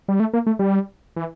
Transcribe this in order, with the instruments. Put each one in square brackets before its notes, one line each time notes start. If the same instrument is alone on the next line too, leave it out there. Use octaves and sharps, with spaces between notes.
[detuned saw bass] G3
A3
A#3
A3
G3
E3